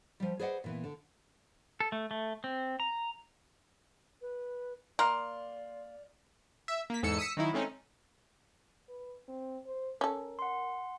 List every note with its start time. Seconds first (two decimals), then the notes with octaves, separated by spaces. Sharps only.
0.20 F3 G3
0.39 G#4 B4 C5 D5 D#5 F#5
0.64 A#2 E3 B3
0.84 D3
1.80 A4
1.92 A3
2.11 A3
2.44 C4
2.80 A#5
4.22 B4
4.99 A#3 D5 C6 F6
6.68 E5
6.90 A#3 B6
7.03 E2 G#2 A4 E6 C#7
7.18 D#6 E6 B6 C#7
7.37 D#3 F#3 D#4 E4
7.53 G#3 A3 C4 C#4 D#4
8.89 B4
9.28 C4
9.66 C5
10.01 C#4 A4 A#4
10.39 F#5 C6